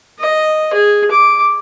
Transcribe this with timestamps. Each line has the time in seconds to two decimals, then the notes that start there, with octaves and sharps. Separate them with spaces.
0.20 D#5
0.73 G#4
1.12 D6